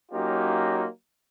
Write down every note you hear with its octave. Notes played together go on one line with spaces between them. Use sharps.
F#3 A#3 C#4 D#4 F4 G4